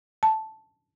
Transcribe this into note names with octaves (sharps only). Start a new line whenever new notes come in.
A5